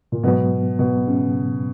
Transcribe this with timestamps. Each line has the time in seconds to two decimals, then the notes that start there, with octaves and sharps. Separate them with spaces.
0.12 A#2
0.24 G#2 B2 F#3 B3
0.79 B2
1.07 C#3